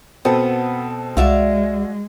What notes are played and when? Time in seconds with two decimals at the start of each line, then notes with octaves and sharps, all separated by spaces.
0.25 B2 B3 C4 A4
1.17 C2 G#3 F#4 D5 E5 F5